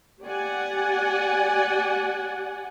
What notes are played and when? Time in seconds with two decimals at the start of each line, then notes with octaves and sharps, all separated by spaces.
0.22 G4 D5 F#5 G#5